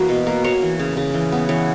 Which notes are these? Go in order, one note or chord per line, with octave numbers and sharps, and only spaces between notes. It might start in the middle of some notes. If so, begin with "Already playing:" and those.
Already playing: E3 A#3 F#4 B4
B2
A#3
A#3 C#5
E3
C#3
C#3
E3
B3
E3 C#5